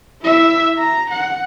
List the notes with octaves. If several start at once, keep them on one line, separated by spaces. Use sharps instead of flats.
E4 E5
A#5
F#5